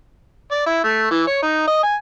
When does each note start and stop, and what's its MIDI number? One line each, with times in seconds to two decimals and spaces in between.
0.51 0.64 74
0.66 0.84 64
0.84 1.08 57
1.11 1.23 52
1.27 1.40 73
1.42 1.64 63
1.67 1.81 75
1.83 1.95 80